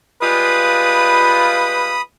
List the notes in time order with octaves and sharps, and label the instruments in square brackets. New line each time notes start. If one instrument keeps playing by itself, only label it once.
[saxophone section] G3 G#3 F4 [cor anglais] B4 [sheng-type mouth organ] B5 D#6